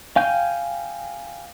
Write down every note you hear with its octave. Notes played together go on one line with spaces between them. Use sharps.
F5 G5 G#5 G6